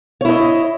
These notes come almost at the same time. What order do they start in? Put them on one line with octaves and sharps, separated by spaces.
C#5 E4 D#5